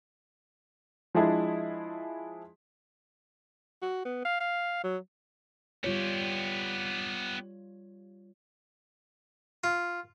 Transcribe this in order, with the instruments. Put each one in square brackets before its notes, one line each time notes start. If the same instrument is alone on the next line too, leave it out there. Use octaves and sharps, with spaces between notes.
[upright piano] F3 G#3 D4 E4 G#4
[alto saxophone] F#4
B3
F5
F5
F#3
[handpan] G3 F4 C#5 [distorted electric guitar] B3 G4
[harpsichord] F4